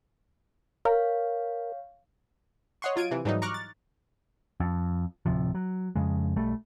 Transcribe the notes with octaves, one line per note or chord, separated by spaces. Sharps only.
A#4 C#5 F5
C#5 D#5 F#5 C6 C#6
F#3 F4 G#6 D7 D#7
C3 E3
G#2 E3 F#3 G3 D#4
A#5 C#6 D6 F6 F#6
A6
F2
D1 C3 F3
F#3
F2 C#3 G#3
B1 G3 A3